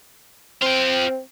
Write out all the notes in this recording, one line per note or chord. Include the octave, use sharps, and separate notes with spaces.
C4 F4 G5